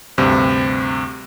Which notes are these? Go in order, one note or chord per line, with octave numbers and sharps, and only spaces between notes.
D2 G2 C3